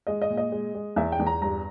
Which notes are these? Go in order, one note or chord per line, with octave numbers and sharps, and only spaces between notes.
G#3 D#5
D#5
A#2
D#5
G#3
G#3
E2 E5
G5
E2
A#5
G2 A#5